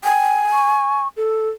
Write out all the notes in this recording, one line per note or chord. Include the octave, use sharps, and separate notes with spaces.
G5 G#5
C#6
A4